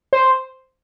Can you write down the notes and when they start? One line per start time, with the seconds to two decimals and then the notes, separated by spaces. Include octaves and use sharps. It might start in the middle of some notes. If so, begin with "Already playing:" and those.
0.13 C5